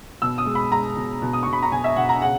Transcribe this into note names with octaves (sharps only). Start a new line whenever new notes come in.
B2 E6
D#6
G#3
B5
G#3 A#5
B2
B2
D#6
B2 C#6
B5
A#5
B2 G#5
E5
B2 F#5
A#5
C#3 F#5